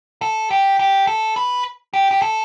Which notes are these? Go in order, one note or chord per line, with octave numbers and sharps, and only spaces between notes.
A4
G4
G4
A4
B4
G4
G4
A4